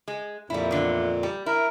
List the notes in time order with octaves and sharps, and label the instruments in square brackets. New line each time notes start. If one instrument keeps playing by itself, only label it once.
[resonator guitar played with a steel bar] G#3
[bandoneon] F2 A#2 [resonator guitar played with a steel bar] G3 E4
[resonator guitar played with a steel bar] E2 D3
G3
[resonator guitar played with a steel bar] E4 [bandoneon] A#4